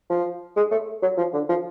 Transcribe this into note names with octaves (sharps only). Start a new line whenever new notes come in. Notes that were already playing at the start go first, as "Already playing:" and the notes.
F3
G#3
A3
F#3
F3
D3
F3